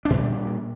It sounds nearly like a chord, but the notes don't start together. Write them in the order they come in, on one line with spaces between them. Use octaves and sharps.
D4 A#2 G3